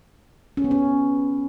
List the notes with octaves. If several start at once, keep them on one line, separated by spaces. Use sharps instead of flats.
C#4
B3
C#4